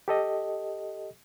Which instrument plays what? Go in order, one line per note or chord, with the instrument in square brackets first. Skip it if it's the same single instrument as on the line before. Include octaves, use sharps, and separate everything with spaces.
[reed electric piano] G4 A4 D#5